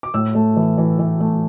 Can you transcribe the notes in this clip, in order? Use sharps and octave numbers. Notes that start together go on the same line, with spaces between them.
D6
A2 E6
A3
E3
E3
E3
A3